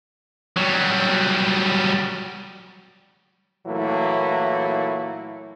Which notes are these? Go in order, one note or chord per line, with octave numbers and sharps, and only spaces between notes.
F#3 G3
A#2 E3 F#3 A3 A#3 E4